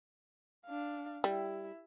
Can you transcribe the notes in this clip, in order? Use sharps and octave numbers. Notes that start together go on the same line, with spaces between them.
D4 F5
G3 E4 E5